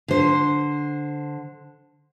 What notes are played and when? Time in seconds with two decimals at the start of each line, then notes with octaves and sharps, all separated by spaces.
0.08 D3 C5